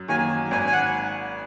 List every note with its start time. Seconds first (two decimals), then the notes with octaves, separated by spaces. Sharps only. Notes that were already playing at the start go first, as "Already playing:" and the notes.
Already playing: F#2
0.08 D#3 F#3 A#3 G#5
0.51 G#1 G#5
0.67 G#5
0.73 F#5